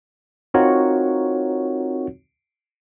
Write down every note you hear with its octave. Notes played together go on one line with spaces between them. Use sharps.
C4 D#4 F4 F#4 A#4 C#5